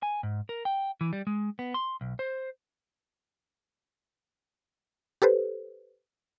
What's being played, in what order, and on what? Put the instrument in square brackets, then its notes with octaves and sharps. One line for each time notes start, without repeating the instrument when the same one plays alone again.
[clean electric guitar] G#5
G#2
A#4
G5
E3
G3
G#3
B3
C6
B1
C5
[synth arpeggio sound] G4 A4 B4 C5